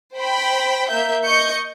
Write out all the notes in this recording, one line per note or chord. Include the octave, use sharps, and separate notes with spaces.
C5 G5 B5
A#3 E5 G6
D#5 C#6 G6 C#7